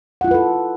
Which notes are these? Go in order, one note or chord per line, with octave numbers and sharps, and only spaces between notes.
E4 F4 A4 B4 F#5